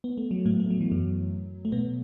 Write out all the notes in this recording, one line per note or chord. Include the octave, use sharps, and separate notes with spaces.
B3
A3
F#3
A2 A3
A3
F#3
E3
F#2 F#3
A3
B2 B3